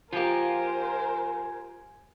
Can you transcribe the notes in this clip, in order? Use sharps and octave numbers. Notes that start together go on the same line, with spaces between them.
F3 A#3 F4 G4 A#4 C5 G#5